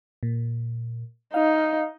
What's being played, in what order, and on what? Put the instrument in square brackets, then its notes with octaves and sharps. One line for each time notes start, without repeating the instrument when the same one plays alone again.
[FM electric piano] A#2
[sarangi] D#4 [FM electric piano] F5